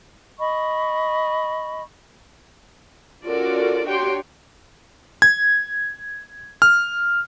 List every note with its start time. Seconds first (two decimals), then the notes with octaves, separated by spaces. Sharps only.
0.39 D#5 B5 C#6
3.26 C#4 F4 F#4 A4 A#4 D5
3.85 D4 F#4 G4 C#5 G5 C6
5.22 G#6
6.62 F6